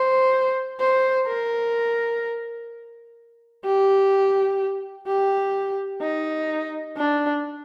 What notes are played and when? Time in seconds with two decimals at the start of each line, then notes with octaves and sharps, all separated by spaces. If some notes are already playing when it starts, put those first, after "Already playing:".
Already playing: C5
0.80 C5
1.27 A#4
3.66 G4
5.08 G4
6.02 D#4
6.97 D4